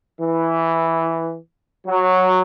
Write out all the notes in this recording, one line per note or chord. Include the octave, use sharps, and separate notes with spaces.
E3
F#3